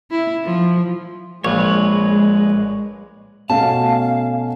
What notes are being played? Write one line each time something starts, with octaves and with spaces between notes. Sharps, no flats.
E4
F3
A#1 G#3 B4 C#5
B2 A3 C#4 F5 A5